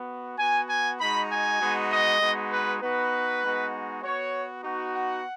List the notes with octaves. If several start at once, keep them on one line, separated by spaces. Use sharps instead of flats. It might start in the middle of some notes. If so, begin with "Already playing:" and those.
Already playing: B3 F#4
B3 F#4 G#5
G#5
G#3 D#4 F#4 B5
G#5
G#3 B3 D#4 F#4
D#5
G#3 B3 D#4 F#4
B4
B3 D#4 F#4 B4
G#3 B3 D#4 F#4
B3 F#4 C#5
B3 D#4 F#4
F#5